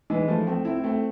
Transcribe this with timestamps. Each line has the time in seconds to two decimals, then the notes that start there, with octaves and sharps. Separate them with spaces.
0.10 E3 G#3
0.28 F3 A3
0.47 A3 C4
0.65 C4 E4
0.84 A3 C4